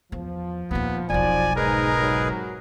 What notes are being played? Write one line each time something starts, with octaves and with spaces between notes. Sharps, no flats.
E2 F3
D#2 A#2 B3
E1 B1 F3 D5 G#5
G#2 D#4 G#4 A#4 B4
G#2 C3 F#3